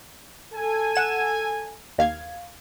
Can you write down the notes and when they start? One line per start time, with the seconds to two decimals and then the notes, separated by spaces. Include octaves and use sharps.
0.54 A4 G#5
0.95 F#5 E7
1.98 D#2 F5 G#6